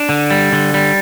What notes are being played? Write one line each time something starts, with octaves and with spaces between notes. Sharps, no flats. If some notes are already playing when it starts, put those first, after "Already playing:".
Already playing: D4
D3
G3
D3
G3